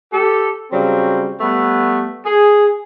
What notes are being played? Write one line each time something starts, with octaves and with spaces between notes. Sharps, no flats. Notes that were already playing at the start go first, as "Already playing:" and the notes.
G4 A4
C#3 F#3 G3 C4
G3 A3 B3
G#4